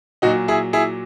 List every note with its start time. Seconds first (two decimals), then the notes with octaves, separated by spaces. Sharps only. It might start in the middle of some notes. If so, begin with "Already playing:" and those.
0.22 A#2 F#3 D#4 F#4
0.48 E4 G#4
0.73 E4 G#4